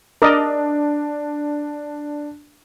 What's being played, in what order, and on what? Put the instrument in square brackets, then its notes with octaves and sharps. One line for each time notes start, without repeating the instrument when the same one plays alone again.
[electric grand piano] D4 [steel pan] A#4 D5 D#5